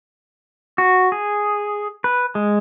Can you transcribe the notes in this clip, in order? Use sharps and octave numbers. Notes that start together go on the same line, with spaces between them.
F#4
G#4
B4
G#3